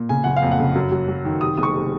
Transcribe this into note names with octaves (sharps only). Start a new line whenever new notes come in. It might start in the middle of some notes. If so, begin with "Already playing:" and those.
Already playing: A#2
C#3 G#5
F#1 F#5
F5
F2
F#5
C#3
F#2
F#3
F#3
D#3
C3 D#6
F#1 D#6
C#6
C3